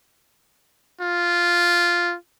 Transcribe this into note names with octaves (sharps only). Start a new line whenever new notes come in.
F4